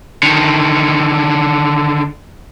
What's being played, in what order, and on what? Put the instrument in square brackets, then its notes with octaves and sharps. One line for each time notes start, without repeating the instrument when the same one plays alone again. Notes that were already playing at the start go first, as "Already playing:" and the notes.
[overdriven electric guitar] D3 D#3